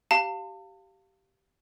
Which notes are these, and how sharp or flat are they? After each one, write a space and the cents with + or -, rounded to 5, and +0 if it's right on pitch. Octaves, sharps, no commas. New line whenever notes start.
G4 -15 F5 +0 A5 +35